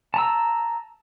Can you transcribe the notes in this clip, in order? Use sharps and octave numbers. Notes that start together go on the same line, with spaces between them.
A5 A#5 E6